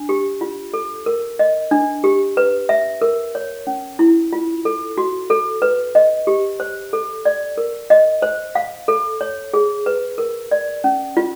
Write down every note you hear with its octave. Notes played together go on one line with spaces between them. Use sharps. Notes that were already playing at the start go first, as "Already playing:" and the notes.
Already playing: D4
G4
F4
A4
A#4
D#5
D4
G4
B4
E5
A#4
C#5
C#4
E4
F4
A4
F#4
A4
B4
D#5
G4
C5
A4
D5
A#4
D#5
C5
F5
A4
C#5
G#4
B4
A#4
D5
C#4
F4